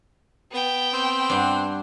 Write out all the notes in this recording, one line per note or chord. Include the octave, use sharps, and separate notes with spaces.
B3 G5
C4
G2 D4 F#5